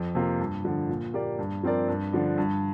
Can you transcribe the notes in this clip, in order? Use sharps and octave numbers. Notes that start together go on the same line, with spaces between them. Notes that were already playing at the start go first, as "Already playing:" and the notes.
Already playing: F2
C3 A#3 F4
G2
D3 F3
A#2
A#3 G4 D5
G2
F3 C4 A#4 D5
G2
D3 F3 D4
G2